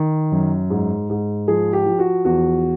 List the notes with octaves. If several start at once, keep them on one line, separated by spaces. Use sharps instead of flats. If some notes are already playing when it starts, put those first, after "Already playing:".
Already playing: D#3
F#2
G#2
G#2
F3 G#4
G4
F3
F#4
E2 F#4